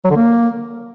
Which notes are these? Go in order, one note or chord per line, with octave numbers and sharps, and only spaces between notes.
F#3
D3
A#3